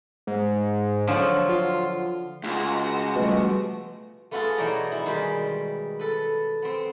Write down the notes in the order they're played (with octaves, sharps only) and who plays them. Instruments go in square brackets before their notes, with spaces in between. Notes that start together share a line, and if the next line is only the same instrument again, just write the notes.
[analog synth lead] G#2
[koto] D3 F3 F#3
[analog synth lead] F4
[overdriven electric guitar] C#2 [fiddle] G#3 F#4
[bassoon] B2 [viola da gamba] F3 G3 A3
[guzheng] A3 B3 F4 F#4 G#4 A4
B2 E3 D#4 C#5 D5 A#5
E4
B2 D#3 G3 G#3
A4 B4
B3 C4